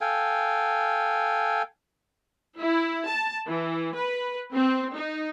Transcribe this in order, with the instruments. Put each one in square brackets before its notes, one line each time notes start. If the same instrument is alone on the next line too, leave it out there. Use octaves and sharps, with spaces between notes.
[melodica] A4 F5 G5 G#5
[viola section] E4
A5
E3
B4
C4
D#4